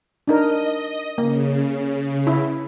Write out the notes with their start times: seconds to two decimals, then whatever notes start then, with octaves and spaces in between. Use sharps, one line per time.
0.28 D4 D#4 A#4 D#5
1.18 C#3 A#3
2.27 E4